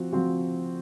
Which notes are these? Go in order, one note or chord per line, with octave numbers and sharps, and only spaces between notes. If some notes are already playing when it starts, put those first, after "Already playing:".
Already playing: F3 C4 F#4
F3 C4 F#4